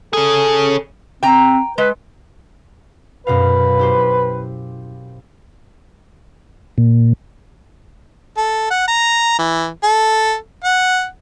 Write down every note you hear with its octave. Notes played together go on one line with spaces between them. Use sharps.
C#4 G#4 A4
C4 G5 A#5
G#3 B4
F#2 B2 B4 F5
E4 G4 C5
A#2
A4
F#5
A#5
E3
A4
F#5